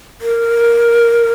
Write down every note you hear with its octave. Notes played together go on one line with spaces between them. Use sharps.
A#4